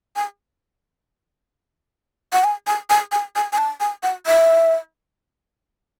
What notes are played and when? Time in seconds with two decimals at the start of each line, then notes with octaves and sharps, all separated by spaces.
0.16 G#5
2.33 F#5
2.44 G#5
2.67 G#5
2.90 G#5
3.12 G#5
3.36 G#5
3.53 G#5
3.58 A5
3.80 G#5
4.03 F#5
4.27 E5